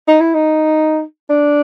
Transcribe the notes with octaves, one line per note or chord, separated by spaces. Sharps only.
D#4
E4
D#4
D4